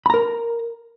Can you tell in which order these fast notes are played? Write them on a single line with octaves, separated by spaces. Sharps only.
B5 A#5 A#4